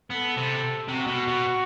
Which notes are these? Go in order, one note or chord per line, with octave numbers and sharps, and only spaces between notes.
B3 A4
C3
C3 F#4
B2
B2